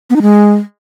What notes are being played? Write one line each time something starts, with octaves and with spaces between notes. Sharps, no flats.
B3
D#4
G#3